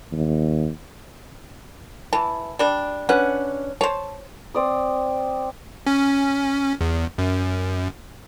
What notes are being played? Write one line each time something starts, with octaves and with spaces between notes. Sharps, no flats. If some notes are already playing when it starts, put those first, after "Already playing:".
D#2
E3 A5
G3 D4
C#4 D4 B4 F#5
C5 C#5 A5
C4 D5 D#6
C#4
E2
F#2